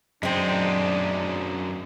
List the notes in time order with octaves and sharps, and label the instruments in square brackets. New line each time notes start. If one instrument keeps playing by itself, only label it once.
[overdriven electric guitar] F#2 D#4 [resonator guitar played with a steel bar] G#3 C4 [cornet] D4